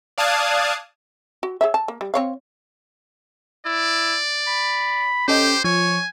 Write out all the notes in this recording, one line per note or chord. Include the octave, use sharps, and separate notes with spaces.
D5 F5 A5 D#6 F#6 G#6
F#4
G#4 C#5 E5
A5
A#3
G3
C4 C#5 F5
E4 D5
B5
C#4 G4 A4 C5 D#5
F3 C#5 G#5